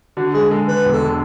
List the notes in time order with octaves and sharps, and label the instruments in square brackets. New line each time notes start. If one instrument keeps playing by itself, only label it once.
[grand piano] D3 [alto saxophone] F#4
[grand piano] G#3 [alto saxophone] G#4
[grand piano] G#3 [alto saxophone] A4
[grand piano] D3 [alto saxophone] B4
[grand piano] E1
[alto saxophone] A4
[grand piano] D3